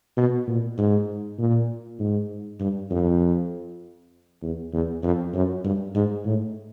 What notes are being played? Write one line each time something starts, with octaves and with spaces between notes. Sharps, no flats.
B2
A#2
G#2
A#2
G#2
G2
F2
E2
E2
F2
F#2
G2
G#2
A2